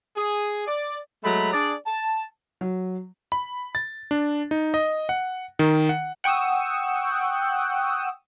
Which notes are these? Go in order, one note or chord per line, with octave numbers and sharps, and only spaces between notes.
G#4
D5
F#3 G#3 A3 A#5 B5
D4 G#4 D5
A5
F#3
B5
A6
D4
D#4
D#5
F#5
D#3
F#5
F#5 G5 C#6 D#6 E6